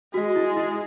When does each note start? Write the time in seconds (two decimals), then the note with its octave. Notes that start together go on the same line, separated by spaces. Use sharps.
0.14 G#3 F#4
0.36 E4
0.57 E4